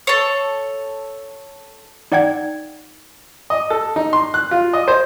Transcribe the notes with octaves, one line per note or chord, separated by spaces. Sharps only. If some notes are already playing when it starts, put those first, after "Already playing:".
A4 C#5
D#4 D5 F#5 G5 G#6
D#5
A4
D#4
C6
F#6
F4
D#5
C5